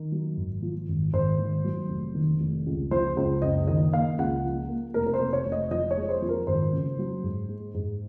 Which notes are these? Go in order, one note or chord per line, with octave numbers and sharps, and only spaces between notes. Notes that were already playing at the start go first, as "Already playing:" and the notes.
Already playing: D#3
F#3
G#1
F3
G#1
G#1 C5
D#3
F#3
F1
D#3
F1
C#2
F3 C5
C#2 C5
F#1 D#5
D#3 D#5
A#3 F5
C#2 F#5
F3
A#3
F1 A#4
A#4
C5
C3
C#5
F1
D#5
F2 D#5
C#5
G#3
C5
F2
A#4
G#1 C5
C#3
F#3
G#2
G#3
G#2